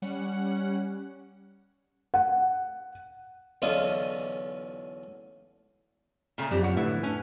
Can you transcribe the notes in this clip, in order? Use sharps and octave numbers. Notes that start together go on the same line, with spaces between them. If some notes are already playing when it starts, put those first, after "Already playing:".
G3 C#4 F#5
F#5
B1 E2 D3 C#4 F4 D#5
A#2 C#3 A3
F#2 F3 C4 D4 G4
C#5 F#5
A2 D3 E4 B4
C#4 D4 G#5